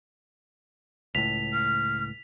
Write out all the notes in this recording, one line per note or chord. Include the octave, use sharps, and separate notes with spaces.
C#2 A2 B6 F7
F6